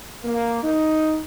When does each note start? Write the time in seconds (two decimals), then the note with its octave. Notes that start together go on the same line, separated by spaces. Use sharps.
0.25 A#3
0.62 D#4